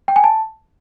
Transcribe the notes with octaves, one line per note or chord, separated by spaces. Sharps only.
G5
G#5
A5